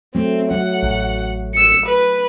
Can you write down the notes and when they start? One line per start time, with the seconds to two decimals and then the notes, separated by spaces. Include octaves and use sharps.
0.15 F#3 A3 C4
0.51 F#3 F#5
0.83 A1
1.55 E6 C#7
1.86 B4